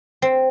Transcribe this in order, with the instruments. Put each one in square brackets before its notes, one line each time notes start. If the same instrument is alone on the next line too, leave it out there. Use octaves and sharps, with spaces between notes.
[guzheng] C4